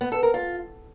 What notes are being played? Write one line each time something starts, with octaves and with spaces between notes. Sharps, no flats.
B3
A4
A#4
F4